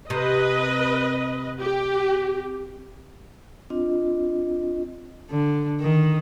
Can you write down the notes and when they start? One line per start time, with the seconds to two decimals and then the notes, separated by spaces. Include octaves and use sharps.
0.10 C3 B4 D#5
1.61 G4
3.70 C4 D4 F4 D#5
5.31 D3
5.81 D#3